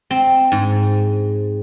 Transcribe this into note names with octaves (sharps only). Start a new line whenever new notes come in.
C4
G#2